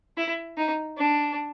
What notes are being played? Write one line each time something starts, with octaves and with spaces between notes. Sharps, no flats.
E4
D#4
D4